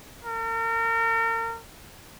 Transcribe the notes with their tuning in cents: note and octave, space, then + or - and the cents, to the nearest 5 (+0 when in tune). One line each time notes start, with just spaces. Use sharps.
A#4 -35